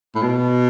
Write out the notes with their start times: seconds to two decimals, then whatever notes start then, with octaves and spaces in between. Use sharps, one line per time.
0.15 A2
0.21 B2